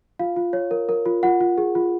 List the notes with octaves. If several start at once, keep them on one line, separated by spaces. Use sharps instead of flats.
F4 F5
F4
C#5
A#4
A#4
F4
F4 F#5
F4
G#4
F4